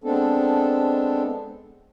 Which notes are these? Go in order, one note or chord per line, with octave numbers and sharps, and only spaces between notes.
G#3 B3 C4 D4 A4